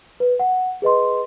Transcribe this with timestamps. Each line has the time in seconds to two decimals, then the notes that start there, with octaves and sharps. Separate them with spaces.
0.20 B4
0.40 F#5
0.82 G#4 B4 D#5 C6